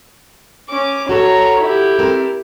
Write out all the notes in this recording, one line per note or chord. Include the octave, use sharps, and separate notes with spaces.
C#4 D6
F#4 A4 C#5 A#5
E4 G4
C4 A4 A#4